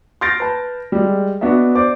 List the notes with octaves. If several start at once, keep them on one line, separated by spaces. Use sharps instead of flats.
C6 F6 G6 A6 A#6 D7
B4 A5
G3 G#3
B3 D4 F#4 D#5 E5
C5 D5 D6